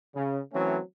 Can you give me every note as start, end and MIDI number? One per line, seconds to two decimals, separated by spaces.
0.16 0.39 49
0.54 0.78 52
0.54 0.78 54
0.54 0.78 57
0.54 0.78 60
0.54 0.78 61